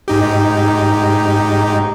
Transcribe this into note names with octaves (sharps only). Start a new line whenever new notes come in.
G#2 D#4 G4